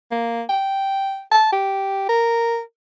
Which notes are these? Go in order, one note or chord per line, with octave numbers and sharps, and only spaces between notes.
A#3
G5
A5
G4
A#4